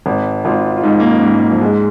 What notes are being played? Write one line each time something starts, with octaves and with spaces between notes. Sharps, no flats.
G#1
G#1 F4
F4
G#2 D#4
A#3
C#4
G#2
A#3
F3
G#2 G#3